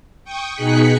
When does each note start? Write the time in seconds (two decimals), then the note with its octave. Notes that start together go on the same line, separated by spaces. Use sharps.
0.24 G5 C#6 D#6
0.54 B2 D#4 G#4 F#6 B6 C#7